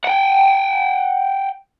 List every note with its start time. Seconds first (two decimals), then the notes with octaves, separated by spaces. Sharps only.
0.04 F#5 G5